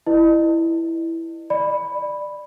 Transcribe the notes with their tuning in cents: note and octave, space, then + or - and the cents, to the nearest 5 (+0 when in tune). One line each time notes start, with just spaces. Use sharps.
E4 +0 B4 +0 D#5 -35
D5 +15 B5 +0